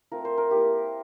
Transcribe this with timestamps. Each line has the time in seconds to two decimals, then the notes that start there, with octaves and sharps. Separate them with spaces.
0.12 A3 C4 F4 A#4
0.25 C5
0.38 A#4
0.51 A#3 E4 G4